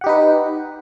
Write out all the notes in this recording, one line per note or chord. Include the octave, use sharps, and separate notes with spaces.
D#4 G4 B4 F#5